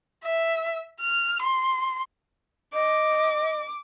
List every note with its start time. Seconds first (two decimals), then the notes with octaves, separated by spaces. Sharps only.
0.24 E5
1.00 F6
1.43 C6
2.74 D#5 D6